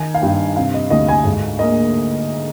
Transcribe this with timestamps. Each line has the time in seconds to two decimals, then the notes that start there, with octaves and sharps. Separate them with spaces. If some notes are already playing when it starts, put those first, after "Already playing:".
Already playing: D#3 D#4 G#5
0.14 F5
0.22 G2 G5
0.56 C3 F5
0.74 D#5
0.90 D2 D#5
1.09 G#5
1.25 G#2
1.59 A#3 D#5